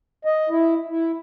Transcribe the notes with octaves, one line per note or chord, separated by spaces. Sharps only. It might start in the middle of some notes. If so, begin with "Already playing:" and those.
D#5
E4
E4